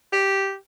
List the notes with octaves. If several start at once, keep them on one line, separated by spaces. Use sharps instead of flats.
G4